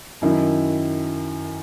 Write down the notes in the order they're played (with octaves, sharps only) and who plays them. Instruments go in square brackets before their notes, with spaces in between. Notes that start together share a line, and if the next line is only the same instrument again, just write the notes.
[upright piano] F#2 D#3 E4